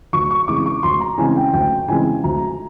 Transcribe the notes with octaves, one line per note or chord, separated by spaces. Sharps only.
D2 C#6
C#6
C#3 E3 G#3 C4 D6
C#6
D2 C6
A#5
C#3 E3 G#3 C4 G#5
G5
D2 G5
C#3 E3 G#3 C4 G#5
D2 A#5